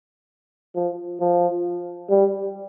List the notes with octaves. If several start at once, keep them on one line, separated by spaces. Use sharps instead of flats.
F3
F3
G3